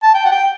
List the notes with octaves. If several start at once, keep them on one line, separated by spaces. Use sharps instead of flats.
A5
G5
F#5
G5